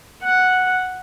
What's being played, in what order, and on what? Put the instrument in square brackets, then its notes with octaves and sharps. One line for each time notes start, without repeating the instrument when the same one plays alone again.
[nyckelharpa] F#5